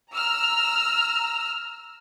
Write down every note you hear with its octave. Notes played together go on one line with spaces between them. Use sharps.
A#5 E6 F6